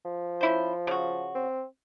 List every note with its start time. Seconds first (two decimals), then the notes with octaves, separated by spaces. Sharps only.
0.05 F3
0.41 C#4 E4 C5
0.87 C#3 F#4
1.35 C4